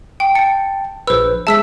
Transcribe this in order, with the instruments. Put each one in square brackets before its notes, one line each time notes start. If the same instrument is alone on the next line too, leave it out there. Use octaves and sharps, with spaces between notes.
[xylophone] G5
[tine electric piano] G5 A5 [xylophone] C#7
[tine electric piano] A#1 B4 [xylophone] C5 E6
[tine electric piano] G#3 G#4 E5 [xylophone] A5 E6 B6